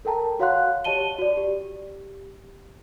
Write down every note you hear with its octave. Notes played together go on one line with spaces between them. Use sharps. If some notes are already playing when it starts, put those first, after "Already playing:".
A4 A#4 G5 A5 A#5
F#4 C#5 F5 F#5 C6 F#6
G4 C#5 D#5 A5 D#7 G7
F#4 D5
G4